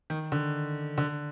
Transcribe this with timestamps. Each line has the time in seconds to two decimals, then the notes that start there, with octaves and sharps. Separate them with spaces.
0.10 D#3
0.32 D3
0.98 D3